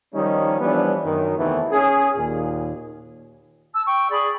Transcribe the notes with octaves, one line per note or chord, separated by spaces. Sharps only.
D#3 F3 G3 C#4 D#4
E3 F3 G3 B3 C#4 D4
F#2 D#3
E2 C3 D#3 E3 A3 B3
C#4 G#4
D#2 A#2
A5 E6
G5 C#6
G#4 D5 B5